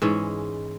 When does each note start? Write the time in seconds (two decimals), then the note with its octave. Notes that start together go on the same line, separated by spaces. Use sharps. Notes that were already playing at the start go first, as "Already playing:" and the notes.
0.02 G#2 E3 G#3 C#4